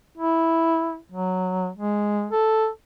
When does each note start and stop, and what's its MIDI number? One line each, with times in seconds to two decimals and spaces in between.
0.18 0.98 64
1.12 1.69 54
1.76 2.26 56
2.32 2.68 69